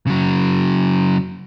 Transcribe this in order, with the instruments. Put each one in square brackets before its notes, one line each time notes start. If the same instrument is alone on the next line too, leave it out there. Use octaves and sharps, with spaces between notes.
[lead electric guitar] C#3 F#3